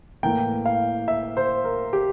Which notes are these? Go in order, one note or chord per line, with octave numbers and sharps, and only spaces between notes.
A2 E3 A#3 G5
F5
E5
C5
A#4
G4